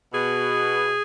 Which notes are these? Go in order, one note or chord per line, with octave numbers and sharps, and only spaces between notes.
B2 G#4